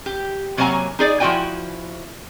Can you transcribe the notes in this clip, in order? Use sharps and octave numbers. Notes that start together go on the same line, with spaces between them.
G4
C3 F#3 A#3 C#5 G#5 A#5
D#4 G#4 D5
F3 E4 F#4 D#5 G5 G#5